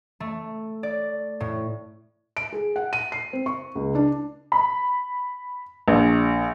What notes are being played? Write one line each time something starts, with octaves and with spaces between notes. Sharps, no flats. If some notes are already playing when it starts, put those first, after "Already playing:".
A3
D5
A2
D7
G#4
F#5
D#7
C7
C4
C#6
C#2
D4
B5
A#1